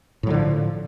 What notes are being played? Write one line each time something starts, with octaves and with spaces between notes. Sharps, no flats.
A2 D3 F3 F#3